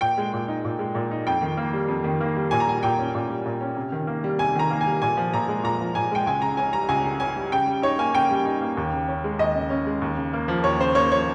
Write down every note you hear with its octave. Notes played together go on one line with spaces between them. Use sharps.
A#2 G5
G#3
A#2
D#4
A#2
G#3
A#2
D#4
F2 G5
D#3
A#3
G3
F2
D#3
A#3
G3
A#2 G#5
A#5
G3 G#5
A#2 G5
C#4
A#2
G3
A#2
C#4
C3
D#3
A#3
G3
C3 G#5
D#3 A#5
A#3
G#5
G3
A#2 G#5
F3
A#2 A#5
G#3
A#2 A#5
F3
A#2 G#5
G#3 G5
C#2 G#5
C#3 A#5
C#4 G#5
G3 A#5
C#2 G#5
C#3
C#4 G#5
G3
C#3 G5
G3
D#4 C#5
A#3 G#5
C#3 G5
G3
D#4
A#3
D#2
C#3
C#4
G#3
D#2 D#5
C#3
C#4
G#3
D#2
C#3
A#3
F3
D#2 C#5
C#3 C5
A#3 C#5
F3 C#5